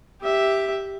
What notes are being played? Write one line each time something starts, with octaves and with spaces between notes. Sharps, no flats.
G4 E5